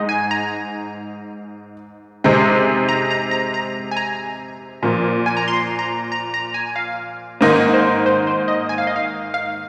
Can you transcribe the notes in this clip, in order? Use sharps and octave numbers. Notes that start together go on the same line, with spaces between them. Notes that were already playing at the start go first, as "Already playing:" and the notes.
Already playing: G#2 G#3 D#4 D#5
G#5
A#5
C3 G#3 C4 D#4
A#5
A#5
A#5
A#5
G#5
A#5
A#2 F3 A#3
G#5
A#5
C6
A#5
A#5
A#5
G#5
F5
G#2 D#3 A#3 D#4 C5
C5
C5
C5
D#5
G#5
F5
D#5
F5
F5